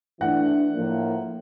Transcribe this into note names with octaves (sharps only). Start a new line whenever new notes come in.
E3 A3 D4 F#5
A2 F3 A#3